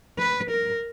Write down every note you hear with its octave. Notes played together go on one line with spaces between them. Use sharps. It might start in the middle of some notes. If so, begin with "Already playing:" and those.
B4
A#4